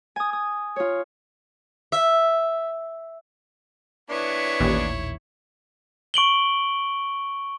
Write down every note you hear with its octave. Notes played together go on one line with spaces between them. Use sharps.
G#5 D#6
D#6
F4 C#5
E5
B3 D4 E4 C#5
A1 D#2 A#2
C#6 D7 F#7 G7